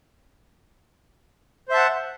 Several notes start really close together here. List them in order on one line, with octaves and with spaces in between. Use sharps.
C5 E5 A5 F#5